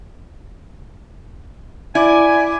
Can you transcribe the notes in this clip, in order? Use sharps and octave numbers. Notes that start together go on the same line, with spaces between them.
E4 D5 G#5